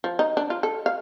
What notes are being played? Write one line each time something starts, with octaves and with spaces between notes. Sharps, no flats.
F3
D#4
D4
F4
A4
F5